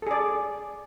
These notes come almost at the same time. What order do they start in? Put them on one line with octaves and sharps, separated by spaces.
A4 G#4 D5